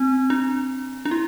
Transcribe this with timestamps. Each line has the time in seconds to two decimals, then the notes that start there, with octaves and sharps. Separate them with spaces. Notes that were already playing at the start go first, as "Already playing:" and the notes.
Already playing: C4
0.30 D4
1.05 D4
1.11 E4